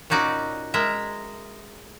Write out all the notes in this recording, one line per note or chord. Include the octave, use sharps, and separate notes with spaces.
A#2 C#4 D#4 F#4 D5
G#3 A#4 E5